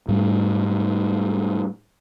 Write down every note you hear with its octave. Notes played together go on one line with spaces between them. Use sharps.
G#2 G3 A3